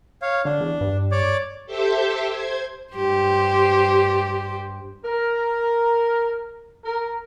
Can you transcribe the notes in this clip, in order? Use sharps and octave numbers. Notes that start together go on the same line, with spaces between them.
C#5 F5
D3 D4
E2
G2
C#5 D5 D6
G4 A4 C5 E5 G5 A5
C5 G#6
G2 G4 C5
A#4
A#4